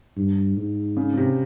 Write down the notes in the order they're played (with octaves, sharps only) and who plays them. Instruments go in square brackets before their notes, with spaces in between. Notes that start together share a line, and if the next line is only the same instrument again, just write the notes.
[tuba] G2
G#2
[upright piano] C#3
C#3
C3